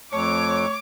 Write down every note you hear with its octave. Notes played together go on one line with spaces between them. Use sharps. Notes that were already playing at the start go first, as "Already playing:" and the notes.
F2 A3 C#5 D6